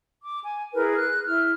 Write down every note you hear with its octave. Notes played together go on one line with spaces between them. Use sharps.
D6
G#5
E4 G#4 A#4 B4
F#6
E4 F6